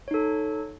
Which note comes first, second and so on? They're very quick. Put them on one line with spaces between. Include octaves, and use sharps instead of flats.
C#5 D#4 A4